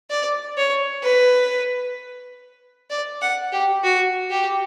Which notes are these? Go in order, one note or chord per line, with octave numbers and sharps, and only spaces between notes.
D5
C#5
B4
D5
F#5
G4
F#4
G4